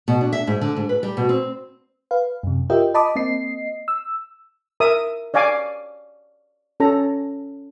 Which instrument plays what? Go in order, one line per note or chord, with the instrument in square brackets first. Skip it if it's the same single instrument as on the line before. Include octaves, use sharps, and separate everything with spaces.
[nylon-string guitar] B2
D4
E5
G#2
D3
G#2
B4
G3
B2
C4
[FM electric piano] B4 F5
F#2 C3
F4 G4 A#4 D#5 E5 G5
D#5 A5 B5 D6 D#6
A#3 C4 D#5 C7
E6
[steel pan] A#4 E5 D#6
C#5 D5 F5 G#5 D6
C#4 A4 A#5